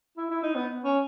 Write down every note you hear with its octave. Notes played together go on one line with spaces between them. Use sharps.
E4
E4
D#4
B3
C#4